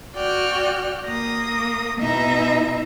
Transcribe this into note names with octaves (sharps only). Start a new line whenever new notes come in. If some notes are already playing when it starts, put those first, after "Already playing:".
F#4 D5 G5 F6 F#6
A#3 D#6 A#6
B2 D#4 E4 E5 A#6